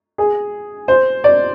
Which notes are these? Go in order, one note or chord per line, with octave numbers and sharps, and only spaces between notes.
G#4
C5
D5